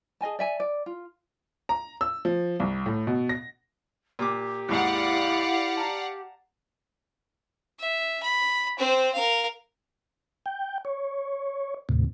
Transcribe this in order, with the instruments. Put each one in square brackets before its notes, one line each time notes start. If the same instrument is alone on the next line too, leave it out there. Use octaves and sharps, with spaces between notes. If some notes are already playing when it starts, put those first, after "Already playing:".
[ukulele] G#4 D#5 G#5 A5
D5 E5 G#5
D5
F4
[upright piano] A#5
E6
F3
C2
A2
B2
A#6
[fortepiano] A#2 D6 [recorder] G4
[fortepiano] D#2 G#2 [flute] E4 [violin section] D5 F5 F#5
[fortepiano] A5 A#5
[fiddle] E5
B5
C4 C5
A#4 F5
[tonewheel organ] G5
C#5
D#2 A2 C3